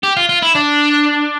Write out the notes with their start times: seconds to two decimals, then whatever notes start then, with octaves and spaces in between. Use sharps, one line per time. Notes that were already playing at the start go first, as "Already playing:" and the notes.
0.03 G4
0.17 F4
0.29 F4
0.42 E4
0.55 D4